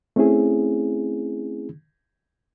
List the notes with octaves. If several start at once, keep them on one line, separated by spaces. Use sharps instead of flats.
A3 C4 C#4 E4 G#4